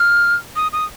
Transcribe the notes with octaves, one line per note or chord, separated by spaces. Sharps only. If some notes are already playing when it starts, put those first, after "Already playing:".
Already playing: F6
D#6
D#6